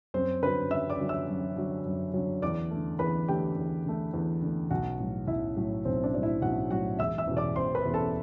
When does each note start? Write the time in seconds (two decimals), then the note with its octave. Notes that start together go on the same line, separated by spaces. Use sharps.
0.14 F#2 C4 C5
0.42 D3 F#3 B4 B5
0.71 F#2 E5 E6
0.90 D5 D6
1.00 D3 F#3
1.09 E5 E6
1.28 F#2
1.57 D3 F#3
1.85 F#2
2.14 D3 F#3
2.42 E2 D5 D6
2.70 D3 A3
2.99 E2 B4 B5
3.28 D3 A3 G4 G5
3.57 E2
3.85 D3 A3
4.14 E2
4.42 D3 A3
4.70 B1 F#4 F#5
4.99 A2 F#3
5.27 B1 E4 E5
5.56 A2 F#3
5.85 B1 C4 C5
6.03 D4 D5
6.14 A2 F#3 D5
6.23 E4 E5
6.41 B1 F#4 F#5
6.70 A2 F#3 F#4 F#5
6.99 E1 E5 E6
7.18 E5 E6
7.27 E2 B2
7.37 D5 D6
7.56 E1 C5 C6
7.75 B4 B5
7.85 E2 B2
7.94 A4 A5